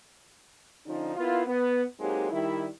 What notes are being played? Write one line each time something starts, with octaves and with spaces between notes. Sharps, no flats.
D3 F3 C#4 D#4
A#3 B3 E4 F4
B3
F#3 G#3 A#3 C4 D#4 G4
D#3 G3 E4